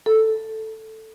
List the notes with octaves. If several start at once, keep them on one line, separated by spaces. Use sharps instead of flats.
A4